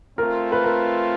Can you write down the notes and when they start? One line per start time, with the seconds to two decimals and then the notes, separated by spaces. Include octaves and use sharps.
0.18 A3 C4 F4 A#4
0.52 B4
0.64 A#4